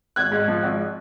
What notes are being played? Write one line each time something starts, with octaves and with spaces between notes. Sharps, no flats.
G#1 F#6 G#6
G#2
F3
G#1